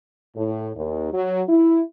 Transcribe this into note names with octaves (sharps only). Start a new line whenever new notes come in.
A2
D#2
F#3
E4